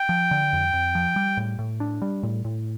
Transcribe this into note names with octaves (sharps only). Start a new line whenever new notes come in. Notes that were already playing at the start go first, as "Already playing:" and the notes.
Already playing: G5
F3
D3
F2
F2
F3
G3
A2
A2
D4
G3
A2
A2